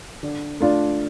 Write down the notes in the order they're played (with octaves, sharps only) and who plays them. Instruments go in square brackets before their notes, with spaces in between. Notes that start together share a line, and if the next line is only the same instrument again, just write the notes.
[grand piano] D3
A3 D4 F4